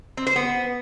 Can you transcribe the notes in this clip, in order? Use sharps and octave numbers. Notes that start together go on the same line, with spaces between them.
C4
C5
B3